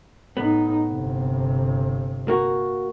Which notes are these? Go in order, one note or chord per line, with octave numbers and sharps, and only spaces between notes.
A2 B3 D#4
G1 C3
A#3 F#4